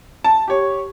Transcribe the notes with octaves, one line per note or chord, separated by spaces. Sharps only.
A5
G4 C#5